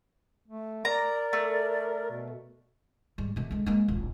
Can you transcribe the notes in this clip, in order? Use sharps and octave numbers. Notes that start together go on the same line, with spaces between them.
A3
A#4 D5 A#5
A3
B2
G#2 G3
B2 A3
D3 G#3
G#3 A#3
D1 A#1